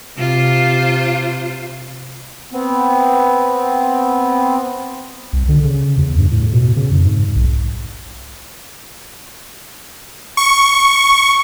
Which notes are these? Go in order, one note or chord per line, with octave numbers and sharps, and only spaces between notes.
C3 F4 C5
B3 C4
C2
D3
C#3
E2
G2
A2
B2
C#3
F2
G#2
B1
C#6